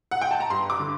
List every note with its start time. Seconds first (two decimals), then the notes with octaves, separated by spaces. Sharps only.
0.11 F#5
0.22 G5
0.31 A5
0.40 A#5
0.50 G2 C6
0.70 D6
0.80 D3